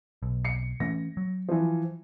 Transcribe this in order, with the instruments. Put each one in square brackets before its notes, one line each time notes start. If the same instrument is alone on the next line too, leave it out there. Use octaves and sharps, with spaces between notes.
[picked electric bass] B1
[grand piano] C7 C#7
[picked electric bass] E3 A3 C#4 [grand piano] A#6
[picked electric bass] F#3
[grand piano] E3 F3